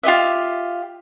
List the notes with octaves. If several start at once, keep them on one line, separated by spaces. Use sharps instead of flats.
F4 G4 D#5 E5